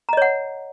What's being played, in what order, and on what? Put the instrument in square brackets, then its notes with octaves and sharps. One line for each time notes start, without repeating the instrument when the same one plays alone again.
[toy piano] A#5
D#5
C#5
F#5